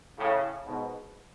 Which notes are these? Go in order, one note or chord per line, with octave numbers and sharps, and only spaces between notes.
A2 C#3
G#2 B2